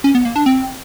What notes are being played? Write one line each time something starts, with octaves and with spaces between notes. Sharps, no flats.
C#4
B3
A#3
D4
C4